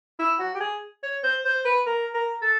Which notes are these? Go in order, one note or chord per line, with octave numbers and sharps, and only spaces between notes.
E4
F#4
G4
G#4
C#5
C5
C5
B4
A#4
A#4
A4